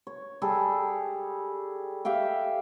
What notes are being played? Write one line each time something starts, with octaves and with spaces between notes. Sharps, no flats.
C#5
G3 G#4 A4
G4 E5 F5 G5